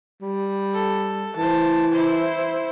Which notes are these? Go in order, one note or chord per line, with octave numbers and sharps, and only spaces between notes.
G3
A4
E3 C5 A5
E4 C5